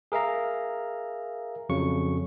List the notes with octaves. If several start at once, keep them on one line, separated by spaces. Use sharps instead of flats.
G#4 A#4 E5 F5 A#5
F2 C#3 F#3 C#6